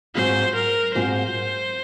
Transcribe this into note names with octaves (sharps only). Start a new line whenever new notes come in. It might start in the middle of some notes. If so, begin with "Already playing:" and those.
G#2 F#3 C4 F4 C5
A#4
G#2 F#3 C4 F4 C5